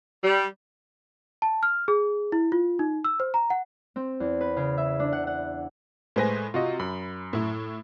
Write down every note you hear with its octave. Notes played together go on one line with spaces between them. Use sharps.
G3
A5
F6
G#4
E4
F4
D#4
E6
C5
A#5
F#5
C4
E2
B4
C#3
E5
D4
F#5
F#5
A2 G#3 B4 C5 G#5 A#6
C3 F4 F#4 D#5
F#2 B5
A2 E4